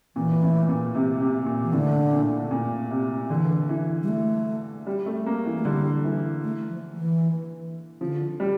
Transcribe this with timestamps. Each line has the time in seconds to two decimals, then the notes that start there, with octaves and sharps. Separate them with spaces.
0.16 A#2 E3
0.43 A2
0.69 A#2
0.95 C3
1.21 C3
1.46 A#2
1.63 E3
1.73 A2 D3
2.12 A#2
2.51 A#2
2.91 C3
3.29 D3 E3
3.69 E3
4.03 G3
4.08 A3
4.87 G3
5.06 A3
5.26 A#3
5.45 E3
5.58 A3
5.65 D3 G3
6.05 E3
6.44 A3
6.69 F3
6.96 E3
8.01 D3 F3
8.40 G3